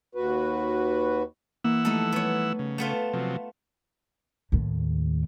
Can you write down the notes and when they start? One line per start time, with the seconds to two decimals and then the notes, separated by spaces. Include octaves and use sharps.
0.15 D#2 F#4 B4
1.64 E3 A#3 F#5 E6
1.85 F3 G3 A3 D#4 A4
2.12 A3 B3 C#5
2.59 C#3
2.78 A3 B3 F4 E7
3.13 C3 F3 F#3
4.52 D#2 A2